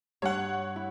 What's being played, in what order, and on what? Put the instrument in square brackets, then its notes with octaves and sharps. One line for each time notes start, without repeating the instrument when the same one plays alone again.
[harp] G2 [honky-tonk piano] C#5 F#5
[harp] E4